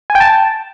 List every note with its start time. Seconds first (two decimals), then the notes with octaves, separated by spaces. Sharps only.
0.10 G#5
0.15 G5
0.20 A5